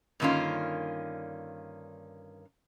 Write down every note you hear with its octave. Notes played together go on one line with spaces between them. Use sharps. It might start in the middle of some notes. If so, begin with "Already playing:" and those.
G2 D3 D#3 A#3 C#4 F4